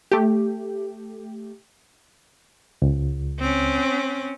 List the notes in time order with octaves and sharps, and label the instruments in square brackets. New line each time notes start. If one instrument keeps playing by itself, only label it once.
[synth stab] A3 G4
[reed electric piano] C#2
[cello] C4 C#4